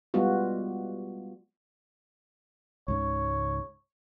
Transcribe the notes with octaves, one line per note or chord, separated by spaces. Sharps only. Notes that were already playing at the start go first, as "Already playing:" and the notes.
G3 G#3 B3 F4 F#4
C#2 G#2 C#3 C#5